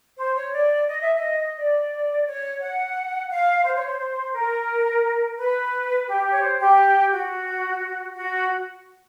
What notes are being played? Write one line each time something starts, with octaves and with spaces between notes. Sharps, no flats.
C5
C#5
D5
D#5
E5
D#5
D5
C#5
F#5
F5
C5
C#5
C5
A#4
B4
G4
C#5
C5
G4
F#4
F#4